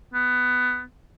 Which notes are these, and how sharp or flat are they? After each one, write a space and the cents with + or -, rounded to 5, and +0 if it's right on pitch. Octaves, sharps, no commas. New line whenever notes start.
B3 +15